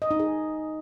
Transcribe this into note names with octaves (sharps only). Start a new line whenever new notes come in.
D#5
D#4
G#4